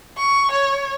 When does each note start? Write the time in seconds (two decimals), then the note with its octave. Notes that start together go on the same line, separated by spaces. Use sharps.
0.18 C#6
0.51 C#5